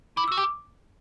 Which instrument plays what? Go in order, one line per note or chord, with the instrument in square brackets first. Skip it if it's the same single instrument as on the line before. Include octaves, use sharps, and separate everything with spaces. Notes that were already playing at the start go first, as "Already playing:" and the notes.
[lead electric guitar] E4 [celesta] D6
[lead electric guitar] F#4 [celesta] E6
[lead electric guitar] G4 [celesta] D6